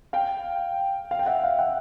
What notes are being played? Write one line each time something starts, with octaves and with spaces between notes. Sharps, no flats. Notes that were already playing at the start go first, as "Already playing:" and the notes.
F5 G5
F5
G5
E5 F#5
F5
E5 F#5